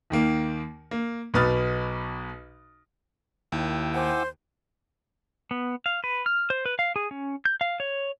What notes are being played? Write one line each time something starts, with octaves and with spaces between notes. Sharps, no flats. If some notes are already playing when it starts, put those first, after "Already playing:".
D#2 D#3 A#3
A#3
B1 B2 B4 D#6 F6 A6
D#2 E4 G5 E6
C5 F#5 G#5 D6
B3
F5
B4
F6
C5
B4
F5
G#4
C#4
G6
F5
C#5